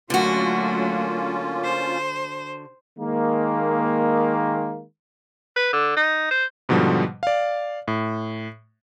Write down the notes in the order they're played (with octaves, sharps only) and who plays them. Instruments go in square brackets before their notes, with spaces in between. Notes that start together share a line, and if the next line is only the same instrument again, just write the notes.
[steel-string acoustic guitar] D3 F#4 [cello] F#3 A3 [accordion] A#3 C#4 F4
[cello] C5
[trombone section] D#3 G#3 A#3
[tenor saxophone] B4
D3
D#4
C5
[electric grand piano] G#2 B2 D3 F3 G3
D5 F5
A2